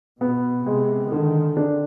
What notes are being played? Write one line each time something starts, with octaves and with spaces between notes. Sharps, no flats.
B2 B3
C3 G#3
D3 D#3
D4